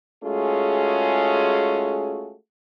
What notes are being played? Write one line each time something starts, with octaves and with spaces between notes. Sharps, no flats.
G#3 A3 C#4 F4 F#4 G#4